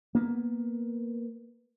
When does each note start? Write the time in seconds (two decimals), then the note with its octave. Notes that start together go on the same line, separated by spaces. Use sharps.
0.15 A#3 B3